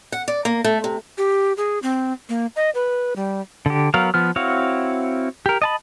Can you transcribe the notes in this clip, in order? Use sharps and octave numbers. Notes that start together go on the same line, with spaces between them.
F#5
D5
A#3
A3
C3
G4
G#4
C4
A#3
D#5
B4
G3
D3 G4
F#3 B3 A#4 F5
F3 B3 F6
C4 E4 F#4 C#5 F5
G4 A#4
D#5 A5 B5